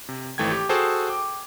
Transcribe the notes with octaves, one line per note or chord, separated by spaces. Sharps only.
C3
G#1 E3 A3 G5 G#6
G4
F#4 G#4 A4 C5 G5 A5
G5 D6